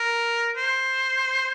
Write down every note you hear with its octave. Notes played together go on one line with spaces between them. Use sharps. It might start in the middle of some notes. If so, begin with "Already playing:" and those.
Already playing: A#4
C5